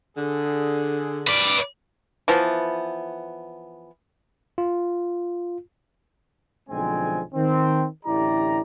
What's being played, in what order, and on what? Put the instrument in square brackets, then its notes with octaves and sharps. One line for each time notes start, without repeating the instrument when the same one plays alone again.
[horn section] D3 G#4
[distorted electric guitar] B4 D5
[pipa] E3 F3 B3
[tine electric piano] F4
[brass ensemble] B1 D3 F3 G#3 C4 G#5
D#3 C4
A1 D3 E4 G4 D5 A#5